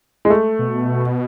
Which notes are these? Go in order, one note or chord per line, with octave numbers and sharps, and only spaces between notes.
G#3
A3
B2